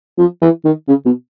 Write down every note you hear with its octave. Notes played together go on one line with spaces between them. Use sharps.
F3
E3
D#3
C#3
B2